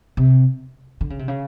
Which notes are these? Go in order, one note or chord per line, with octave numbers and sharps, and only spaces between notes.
C3
D3
C#3
C3
C#3